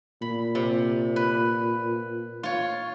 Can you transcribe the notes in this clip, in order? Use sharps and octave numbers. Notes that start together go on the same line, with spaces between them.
A#2 B5
C3
B4
F4 C#5